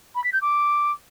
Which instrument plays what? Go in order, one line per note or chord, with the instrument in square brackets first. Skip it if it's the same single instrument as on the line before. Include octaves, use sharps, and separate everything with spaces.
[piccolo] B5
B6
G6
D6